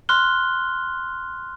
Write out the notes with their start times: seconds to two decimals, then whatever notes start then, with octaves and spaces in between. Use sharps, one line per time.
0.09 C6 F6 F#6 G7